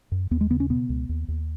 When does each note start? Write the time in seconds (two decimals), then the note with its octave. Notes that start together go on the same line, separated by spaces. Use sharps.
0.12 F#2
0.31 D#2 B3
0.41 G#3
0.50 C#3 B3
0.60 C#4
0.70 B2 B3
0.89 C#2
1.09 D#2
1.28 D#2